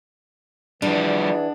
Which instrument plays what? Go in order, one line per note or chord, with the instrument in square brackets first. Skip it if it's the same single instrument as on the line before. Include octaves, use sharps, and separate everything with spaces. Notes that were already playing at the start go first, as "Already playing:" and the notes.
[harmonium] E3 [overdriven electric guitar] F3 G3 [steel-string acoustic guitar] D4 [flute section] G#4 D5 F#5